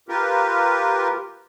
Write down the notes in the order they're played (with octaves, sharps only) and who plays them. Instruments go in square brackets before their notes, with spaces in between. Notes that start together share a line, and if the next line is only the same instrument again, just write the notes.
[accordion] F4 G4 A#4 B4